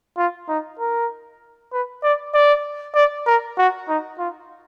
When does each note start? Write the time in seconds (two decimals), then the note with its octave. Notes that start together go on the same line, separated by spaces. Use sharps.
0.18 F4
0.49 D#4
0.79 A#4
1.73 B4
2.03 D5
2.34 D5
2.95 D5
3.27 A#4
3.58 F#4
3.88 D#4
4.19 F4